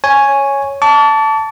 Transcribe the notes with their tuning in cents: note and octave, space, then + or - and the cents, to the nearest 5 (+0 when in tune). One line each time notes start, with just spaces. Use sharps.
C#5 +0 G#5 +0
A5 +0 D6 -45